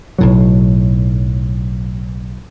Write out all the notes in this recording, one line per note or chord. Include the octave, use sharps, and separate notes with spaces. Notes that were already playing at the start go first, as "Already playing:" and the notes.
B1 A2 F#3